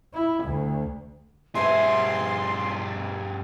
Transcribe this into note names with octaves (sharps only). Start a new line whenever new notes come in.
E4
D2
G2 G#4 B4 C#5 E5 C6